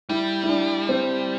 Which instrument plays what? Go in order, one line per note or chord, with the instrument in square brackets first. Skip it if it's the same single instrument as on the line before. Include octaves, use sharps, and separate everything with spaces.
[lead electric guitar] G3 [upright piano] E4
[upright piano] E4
D4
C4